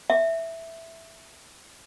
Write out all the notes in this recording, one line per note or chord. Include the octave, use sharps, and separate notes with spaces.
E5